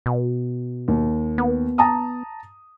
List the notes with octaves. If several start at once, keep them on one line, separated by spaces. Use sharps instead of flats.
B2
D#2
B3
A5 A#5 D#6